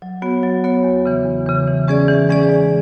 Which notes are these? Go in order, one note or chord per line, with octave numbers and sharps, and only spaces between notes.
F#3
B3 F#4 C#5
F#3
B3 F#4 C#5
E2
C#3 E3
E2
C#3 E3
E3
G#3 C#4 G#4 D5
E3
G#3 C#4 G#4 D5
G#3